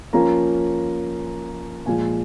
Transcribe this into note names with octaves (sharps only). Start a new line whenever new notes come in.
F3 A#3 C#4 F4 A#5
A#2 F3 G#3 F4 G#5